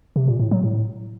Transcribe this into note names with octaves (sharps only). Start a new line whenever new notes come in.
C3
A#2
A2
F#3
A2